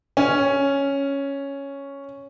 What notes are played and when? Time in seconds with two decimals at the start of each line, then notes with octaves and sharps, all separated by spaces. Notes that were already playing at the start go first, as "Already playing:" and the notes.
0.17 C#4